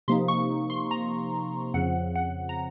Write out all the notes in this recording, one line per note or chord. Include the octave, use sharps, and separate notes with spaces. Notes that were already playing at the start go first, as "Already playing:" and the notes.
C3 F3 A#3 D#4 C6
C#6
C6
A#5
F2 C#3 F3 F#5
F#5
A#5